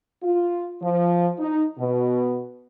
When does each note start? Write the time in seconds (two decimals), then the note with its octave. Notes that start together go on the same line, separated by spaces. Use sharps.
0.23 F4
0.82 F3
1.39 D#4
1.79 B2